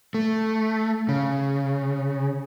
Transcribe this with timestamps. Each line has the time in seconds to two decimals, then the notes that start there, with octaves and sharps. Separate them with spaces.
0.14 A3
1.09 C#3